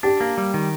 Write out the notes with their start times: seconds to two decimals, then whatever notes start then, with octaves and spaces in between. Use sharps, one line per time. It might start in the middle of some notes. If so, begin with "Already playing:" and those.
0.03 D4 G4
0.20 A#3
0.38 G3
0.54 D#3